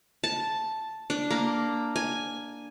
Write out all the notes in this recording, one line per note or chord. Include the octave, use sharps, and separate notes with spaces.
A5
D4
A#3
G#5